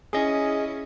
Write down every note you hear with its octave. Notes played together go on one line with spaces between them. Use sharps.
C#4 E4 G#4 D#5